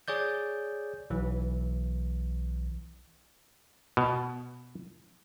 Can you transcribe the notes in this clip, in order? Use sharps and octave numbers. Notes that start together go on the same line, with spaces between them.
G#4 C#5 D5 G6
B1 E3
B2